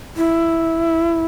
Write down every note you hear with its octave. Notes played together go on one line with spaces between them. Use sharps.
E4